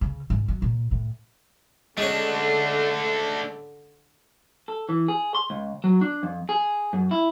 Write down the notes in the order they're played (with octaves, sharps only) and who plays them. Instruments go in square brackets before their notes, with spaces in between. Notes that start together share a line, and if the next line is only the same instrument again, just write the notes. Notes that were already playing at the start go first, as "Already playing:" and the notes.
[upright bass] C#3
G#2
F#3
A#2
A2
[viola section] D3 [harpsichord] G#3 C#4 [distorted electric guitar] A3 D4
[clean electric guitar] A4
E3
G#4
C6
C#2
F#3
D4
F2
G#4
F#2
E4